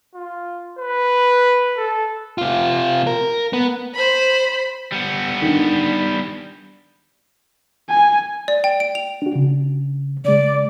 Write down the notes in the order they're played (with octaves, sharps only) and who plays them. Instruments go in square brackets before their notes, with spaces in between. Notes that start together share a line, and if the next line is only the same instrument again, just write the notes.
[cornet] F4
B4
A4
[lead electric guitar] C3 F4
A#4
B3
[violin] C5 B5
[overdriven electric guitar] G3 B3
[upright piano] D3 D#3
[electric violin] G#5
[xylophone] D5
G5
D7
F7
[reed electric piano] D4 F#4
C#3
[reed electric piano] C#3 G#3 [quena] D5